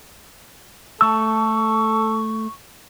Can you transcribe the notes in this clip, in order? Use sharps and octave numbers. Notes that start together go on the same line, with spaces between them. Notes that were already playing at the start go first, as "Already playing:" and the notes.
A3 A4 A5 C#6 E6